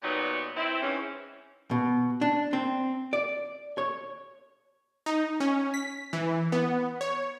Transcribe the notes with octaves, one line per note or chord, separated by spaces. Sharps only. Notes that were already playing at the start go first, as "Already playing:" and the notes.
A#2 F#3 G3 B3 D#4
C4 E4
G#2 E3 C#4
B2
D4
C4
D5
C#5
D#4
C#4
B6
E3
B3
C#5